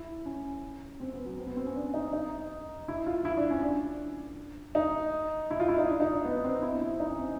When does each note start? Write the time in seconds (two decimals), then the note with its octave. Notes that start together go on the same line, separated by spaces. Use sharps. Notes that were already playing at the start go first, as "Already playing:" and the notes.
Already playing: E4
0.25 C#4
1.00 C4
1.13 B3
1.26 F#3
1.38 C4
1.47 B3
1.57 C4
1.66 C#4
1.76 D4
1.94 D#4
2.13 D#4
2.88 E4
3.06 F4
3.25 E4
3.37 D4
3.50 C#4
3.63 D4
4.75 D#4
5.51 E4
5.60 F4
5.68 E4
5.78 D#4
5.88 D4
6.00 D#4
6.12 D4
6.25 B3
6.44 C4
6.62 E4
6.81 E4
7.00 D#4
7.09 C#4
7.19 C4